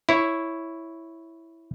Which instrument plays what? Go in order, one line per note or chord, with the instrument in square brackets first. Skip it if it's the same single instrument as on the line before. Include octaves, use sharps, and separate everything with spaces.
[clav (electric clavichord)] E4 C#5